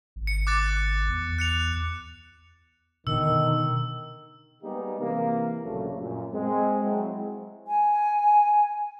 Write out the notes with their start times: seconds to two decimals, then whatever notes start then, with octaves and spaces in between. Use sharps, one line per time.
0.16 G#1
0.27 C#7
0.47 D6 F#6 A6
1.09 E2
1.38 F#6 C#7 F7
3.07 B2 D3 D#3 E6
4.62 G3 G#3 A#3 B3 D#4 G4
5.00 C3 E3 A#3
5.64 A#1 G2 C#3 F#3 G3 A3
5.99 F#2 A#2
6.33 G#3 C4
6.83 F#3 G#3 C4 E4
7.67 G#5